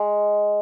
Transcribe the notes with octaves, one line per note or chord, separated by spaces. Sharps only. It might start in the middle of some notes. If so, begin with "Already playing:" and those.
Already playing: G#3